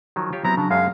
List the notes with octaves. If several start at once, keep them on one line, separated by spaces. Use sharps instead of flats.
D#3 F3 F#3
F4 G4 C#5
F#3 B3 C4 E4 A#5
C#3 D4
F#2 G#3 F5